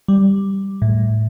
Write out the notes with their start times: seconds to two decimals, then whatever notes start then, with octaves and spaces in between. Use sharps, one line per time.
0.08 G3
0.82 A2